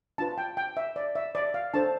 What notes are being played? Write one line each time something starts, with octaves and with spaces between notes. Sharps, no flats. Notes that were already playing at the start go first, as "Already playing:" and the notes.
D4 F4 B4 A5
G5
G5
E5
D5
E5
D5
F5
D4 A4 C5 A5